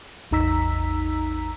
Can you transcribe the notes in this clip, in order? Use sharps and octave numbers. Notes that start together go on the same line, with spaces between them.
A1 E2 D#4 A#5 E6 B6